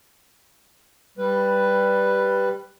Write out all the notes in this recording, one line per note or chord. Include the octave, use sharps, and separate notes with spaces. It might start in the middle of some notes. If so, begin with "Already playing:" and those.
G3 B4